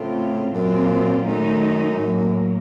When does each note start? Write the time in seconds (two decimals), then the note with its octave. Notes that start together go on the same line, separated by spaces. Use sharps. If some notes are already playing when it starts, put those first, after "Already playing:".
Already playing: A2 C#3 A3 C4 F4
0.54 F#2 A#2 F#3 C4 F4
1.28 F#2 D#3 A3 D#4
2.01 A2 F#3 A#3